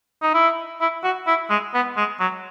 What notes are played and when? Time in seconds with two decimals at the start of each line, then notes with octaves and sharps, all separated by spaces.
0.22 D#4
0.34 E4
0.81 E4
1.04 F#4
1.27 E4
1.50 G#3
1.74 B3
1.97 G#3
2.20 F#3